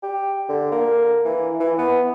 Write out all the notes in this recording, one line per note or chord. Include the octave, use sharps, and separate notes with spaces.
G4
D3
A#3
E3
E3
B3